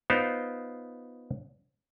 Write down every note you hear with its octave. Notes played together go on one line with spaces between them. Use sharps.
B3 D#4 F4 C5 D5 F5